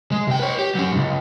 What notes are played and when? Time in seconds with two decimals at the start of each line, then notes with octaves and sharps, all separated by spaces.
0.12 G#3
0.27 C3 G5
0.40 B4 C#5
0.59 G4
0.75 F#3 C#4
0.92 C#2 G#2